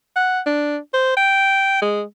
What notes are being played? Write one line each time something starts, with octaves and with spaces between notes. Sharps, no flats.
F#5
D4
C5
G5
G#3